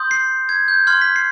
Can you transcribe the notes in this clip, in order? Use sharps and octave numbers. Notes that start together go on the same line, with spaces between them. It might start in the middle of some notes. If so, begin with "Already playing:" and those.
Already playing: C6 D#6 G6
C7
G#6
G6
C6 F6 G#6
B6
C7